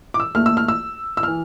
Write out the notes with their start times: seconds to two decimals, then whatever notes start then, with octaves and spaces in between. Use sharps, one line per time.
0.14 D6
0.20 E6
0.34 A#1 A#2 A3 F6
0.46 E6
0.57 F6
0.68 E6
1.17 E6
1.23 E3 F6